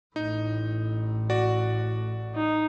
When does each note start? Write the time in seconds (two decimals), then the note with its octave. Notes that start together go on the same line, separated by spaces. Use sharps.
0.16 A1 A2 D#4
1.30 F#4 D5
2.35 D#4